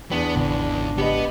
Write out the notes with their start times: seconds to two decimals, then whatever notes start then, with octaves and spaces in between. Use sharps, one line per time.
0.11 E2 B3 D4
0.36 G#1 C#2
0.98 B3 G4 B4 D#5